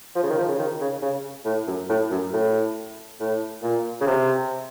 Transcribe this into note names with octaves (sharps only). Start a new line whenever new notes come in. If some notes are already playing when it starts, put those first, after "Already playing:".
F3
C#3
D#3
F3
C#3
D#3
C#3
C#3
A2
F#2
A2
F#2
A2
A2
A#2
C#3
C3